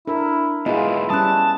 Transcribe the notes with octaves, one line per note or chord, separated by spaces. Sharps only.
D4 E4 A4 A#4
G#2 B2 B3 E4 F4 G#4 D#5
G3 C#4 A5 D#6 F#6